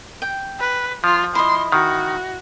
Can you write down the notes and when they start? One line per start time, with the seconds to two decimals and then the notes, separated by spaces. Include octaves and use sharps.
0.22 G5
0.60 B4
1.04 F3 F4
1.35 E4 D#5 C6
1.72 D#3 F#4